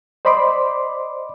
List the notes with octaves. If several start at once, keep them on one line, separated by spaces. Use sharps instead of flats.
C5 D5 D#5 B5 C6 D6